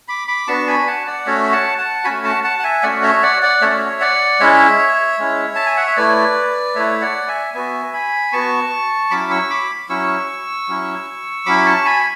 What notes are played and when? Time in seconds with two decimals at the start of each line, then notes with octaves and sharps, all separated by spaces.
0.08 B5 D6
0.28 B5 D6
0.48 B3 D4 F#4 A5 C#6
0.67 G#5 B5
0.87 F#5 A5
1.07 D5 F#5
1.26 A3 C#4 F#4 C#5 E5
1.52 F#5 A5
1.78 F#5 A5
2.04 A3 C#4 F#4 G#5 B5
2.24 F#5 A5
2.44 F#5 A5
2.59 F#5
2.63 E5 G#5
2.83 A3 C#4 F#4 D5 F#5
3.03 C#5 E5
3.23 D5 F#5
3.42 D5 F#5
3.62 A3 C#4 F#4 C#5 E5
4.01 D5 F#5
4.40 G#3 C#4 E4 C#5 E5
5.19 G#3 C#4 E4
5.56 A5
5.66 G#5
5.77 F#5
5.87 E5
5.97 A3 E4 B4 D5
6.75 A3 E4 C#5 E5
7.02 D5 F#5
7.28 E5 G#5
7.54 B3 F#4 E5 G#5
7.93 G#5 B5
8.32 B3 F#4 A5 C#6
9.11 F#3 C#4 E4 B5 D6
9.30 C#6 E6
9.50 B5 D6
9.89 F#3 C#4 E4 C#6 E6
10.68 F#3 C#4 E4
11.46 F#3 C#4 E4 B5 D6
11.66 A5 C#6
11.85 G#5 B5